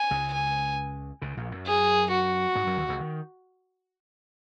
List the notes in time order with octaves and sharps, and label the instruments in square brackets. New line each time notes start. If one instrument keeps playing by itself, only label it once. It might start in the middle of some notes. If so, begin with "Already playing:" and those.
Already playing: [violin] G#5
[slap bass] C#2 C#3
[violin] G#5
[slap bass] C#2 C#3
A#1 A#2
F#2 F#3
[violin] G#4
F#4
[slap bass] G#2 G#3
F#2 F#3
D#2 D#3
C#2 C#3
D#3